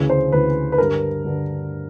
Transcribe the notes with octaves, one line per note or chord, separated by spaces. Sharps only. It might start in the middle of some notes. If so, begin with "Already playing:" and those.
Already playing: D2 C#3 E3
C5
D2 C#3 E3 B4
B4
G2 D3 A#4
G2 D3